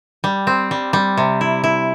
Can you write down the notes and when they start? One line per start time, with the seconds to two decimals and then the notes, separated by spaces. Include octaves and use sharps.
0.24 G3
0.47 C4
0.71 G3
0.93 G3
1.17 C3
1.41 E4
1.64 E4